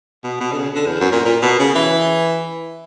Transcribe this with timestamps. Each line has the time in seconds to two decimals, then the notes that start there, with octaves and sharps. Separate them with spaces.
0.24 B2
0.40 B2
0.52 D3
0.58 C#3
0.75 D3
0.87 E2
1.00 F#2
1.12 A#2
1.25 A#2
1.42 B2
1.59 C#3
1.75 E3